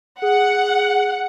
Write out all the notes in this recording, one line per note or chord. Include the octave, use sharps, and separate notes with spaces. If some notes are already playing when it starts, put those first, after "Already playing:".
G#4 F#5